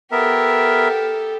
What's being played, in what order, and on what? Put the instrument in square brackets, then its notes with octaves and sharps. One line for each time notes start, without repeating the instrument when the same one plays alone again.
[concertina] B3 A#4 E5 [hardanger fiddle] G4 A4